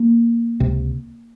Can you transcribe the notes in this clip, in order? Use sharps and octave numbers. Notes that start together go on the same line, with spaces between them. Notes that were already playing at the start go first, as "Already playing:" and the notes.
Already playing: A#3
C#2 C3